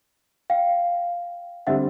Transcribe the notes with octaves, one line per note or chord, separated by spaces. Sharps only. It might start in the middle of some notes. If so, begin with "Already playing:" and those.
F5 G5
D3 G3 C4 E5 F#5